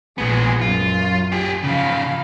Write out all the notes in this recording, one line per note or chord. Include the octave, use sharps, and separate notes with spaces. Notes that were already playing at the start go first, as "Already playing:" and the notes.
A#1 G#3 B3 G#4
F#2 F4
G4 G#4
C#3 F3 F5 B5